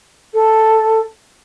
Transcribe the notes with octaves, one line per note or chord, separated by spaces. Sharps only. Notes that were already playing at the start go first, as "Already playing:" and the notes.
A4